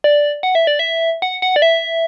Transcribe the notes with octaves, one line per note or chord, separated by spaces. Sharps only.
D5
F#5
E5
D5
E5
F#5
F#5
D5
E5